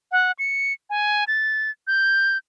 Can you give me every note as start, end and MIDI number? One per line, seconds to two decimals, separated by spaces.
0.12 0.32 78
0.39 0.73 97
0.90 1.24 80
1.28 1.71 93
1.87 2.38 91